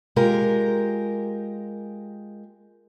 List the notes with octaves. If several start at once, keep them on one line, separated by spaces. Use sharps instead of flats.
G#3 F4 G4 A#4